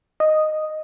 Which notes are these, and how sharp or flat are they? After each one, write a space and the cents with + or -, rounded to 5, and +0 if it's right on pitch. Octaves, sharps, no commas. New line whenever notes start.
D#5 -5